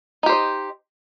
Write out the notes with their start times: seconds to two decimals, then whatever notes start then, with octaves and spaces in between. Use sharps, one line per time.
0.23 D#4
0.26 G4
0.29 C5
0.32 D#5